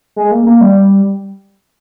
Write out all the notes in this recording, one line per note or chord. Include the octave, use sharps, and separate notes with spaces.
G#3
A#3
A#3
G3